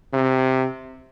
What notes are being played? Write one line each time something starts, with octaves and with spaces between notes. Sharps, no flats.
C3